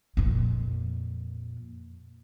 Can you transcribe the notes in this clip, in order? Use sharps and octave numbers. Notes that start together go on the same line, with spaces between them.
F2 A#2